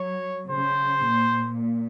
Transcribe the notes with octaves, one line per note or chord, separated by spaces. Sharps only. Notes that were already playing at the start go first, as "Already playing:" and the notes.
Already playing: F#3 C#5
C#3 C5
A#2